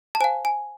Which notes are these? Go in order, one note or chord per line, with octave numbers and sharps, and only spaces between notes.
A5
C5 F5 G#5
G#5